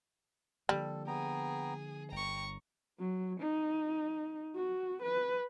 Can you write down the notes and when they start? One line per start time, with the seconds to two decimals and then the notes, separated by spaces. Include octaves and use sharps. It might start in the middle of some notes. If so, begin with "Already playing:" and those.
0.69 D3 F3 G3 A#3 A4
1.07 B3 G#4 G5 A#5
2.12 G1 G5 A#5 C#6
2.99 F#3
3.40 D#4
4.55 F#4
5.02 B4